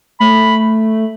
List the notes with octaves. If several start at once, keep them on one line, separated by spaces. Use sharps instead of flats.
A3 B5